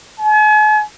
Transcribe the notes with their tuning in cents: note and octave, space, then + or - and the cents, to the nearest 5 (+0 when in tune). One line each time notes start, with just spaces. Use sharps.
G#5 +45